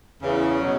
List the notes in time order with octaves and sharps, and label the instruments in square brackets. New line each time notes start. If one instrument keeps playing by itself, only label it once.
[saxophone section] E2 [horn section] C#3
[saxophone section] B2 F#3